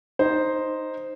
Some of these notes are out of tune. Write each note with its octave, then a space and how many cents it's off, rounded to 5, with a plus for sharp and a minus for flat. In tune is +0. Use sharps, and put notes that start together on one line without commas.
D#4 +0 C5 +0